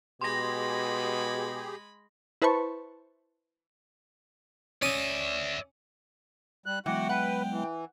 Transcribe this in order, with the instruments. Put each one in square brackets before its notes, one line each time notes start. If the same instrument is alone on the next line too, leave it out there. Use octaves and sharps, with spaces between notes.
[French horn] B2 [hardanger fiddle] G#3 B5 [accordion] G4 G#4 [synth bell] C6 A#6
[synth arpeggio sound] E4 B4 C5 A5 B5 C#6
[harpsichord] C#4 D#6 [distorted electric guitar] D5 E5
[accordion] G3 F#6
[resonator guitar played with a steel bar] E3 [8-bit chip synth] F#3 G#3 B3 [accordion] F#4 F#5 [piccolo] G5
[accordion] B4 [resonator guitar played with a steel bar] F#5
[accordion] E3